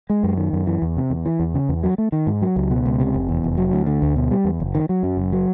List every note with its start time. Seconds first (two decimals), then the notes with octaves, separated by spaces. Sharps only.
0.10 G#3
0.23 F#2
0.37 D#3
0.53 F#2
0.67 E3
0.82 E2
0.97 C3
1.10 E2
1.26 E3
1.40 E2
1.54 C#3
1.69 E2
1.83 F#3
1.98 A3
2.12 D#3
2.27 G#2
2.42 F#3
2.56 C#2
2.71 B2
2.86 C#2
3.00 C3
3.14 F1
3.29 E2
3.44 F1
3.57 F#3
3.73 D2
3.86 D3
4.02 D2
4.16 B2
4.31 G3
4.45 E2
4.60 F#1
4.75 D#3
4.89 F#3
5.03 F#2
5.17 F#1
5.33 F#3